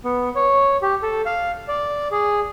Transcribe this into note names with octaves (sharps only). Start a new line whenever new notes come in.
B3
C#5
G4
A4
F5
D5
G#4